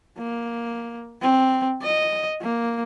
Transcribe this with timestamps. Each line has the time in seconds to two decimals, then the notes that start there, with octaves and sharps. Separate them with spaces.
0.18 A#3
1.22 C4
1.82 D#5
2.41 A#3